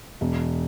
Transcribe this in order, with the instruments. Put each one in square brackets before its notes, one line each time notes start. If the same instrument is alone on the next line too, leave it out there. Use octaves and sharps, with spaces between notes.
[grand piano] E1